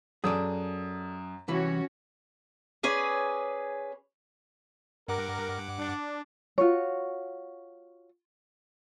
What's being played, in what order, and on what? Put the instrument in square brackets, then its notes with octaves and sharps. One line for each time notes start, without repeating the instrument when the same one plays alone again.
[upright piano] F#2 D#6 [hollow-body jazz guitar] G#4 A4 D5
[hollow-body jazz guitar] C2 E3 E4 [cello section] C#4 F#4 C#5
[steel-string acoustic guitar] C#4 G#4 B4 D5
[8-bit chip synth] G2 F#5 D6 [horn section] A#4
[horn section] D4
[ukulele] F4 F#4 C#5